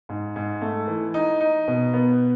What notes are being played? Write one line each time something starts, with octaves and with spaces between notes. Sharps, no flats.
G#2
G#2
A3
E3
D#4
D#4
B2
B3